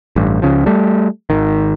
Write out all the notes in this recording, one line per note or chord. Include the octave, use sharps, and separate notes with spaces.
A1 G2
C#2 C#3 F3
G3 A3
G#1 D#3